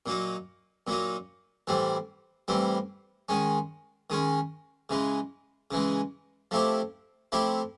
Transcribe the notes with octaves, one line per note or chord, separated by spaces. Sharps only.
A#2 F#3 A#3 D#4
A#2 F#3 A#3 D#4
A2 E3 G3 C4
A2 E3 G3 C4
D#3 G#3 C#4
D#3 G#3 C#4
C#3 E3 G#3
C#3 E3 G#3
F3 A3 C4 E4 G4
F3 A3 C4 E4 G4